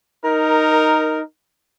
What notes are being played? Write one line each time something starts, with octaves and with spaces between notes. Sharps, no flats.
D#4 A#4